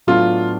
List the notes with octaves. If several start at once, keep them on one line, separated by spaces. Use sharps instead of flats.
A2 F#3 B3 D4 F4